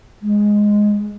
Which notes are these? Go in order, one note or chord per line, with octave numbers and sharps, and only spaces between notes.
G#3